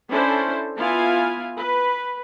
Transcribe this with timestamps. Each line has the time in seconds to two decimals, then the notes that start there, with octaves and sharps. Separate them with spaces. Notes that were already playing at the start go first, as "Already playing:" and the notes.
0.10 C#4 D4 E4 A4 C5
0.77 B3 E4 F4 F5 G#5
1.57 B4